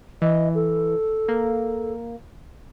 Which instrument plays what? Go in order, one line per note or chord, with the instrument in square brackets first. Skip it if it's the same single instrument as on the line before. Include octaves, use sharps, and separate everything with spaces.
[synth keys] E3 [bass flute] D#5
[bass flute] A4
[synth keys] A#3